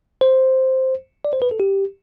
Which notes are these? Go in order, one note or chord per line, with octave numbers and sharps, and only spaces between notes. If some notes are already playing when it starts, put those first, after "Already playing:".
C5
D5
C5
B4
A4
G4